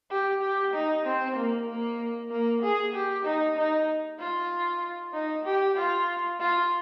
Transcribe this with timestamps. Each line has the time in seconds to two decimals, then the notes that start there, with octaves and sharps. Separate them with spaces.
0.11 G4
0.42 G4
0.74 D#4
1.06 C4
1.36 A#3
1.68 A#3
2.31 A#3
2.63 G#4
2.94 G4
3.25 D#4
3.57 D#4
4.19 F4
5.13 D#4
5.45 G4
5.77 F4
6.40 F4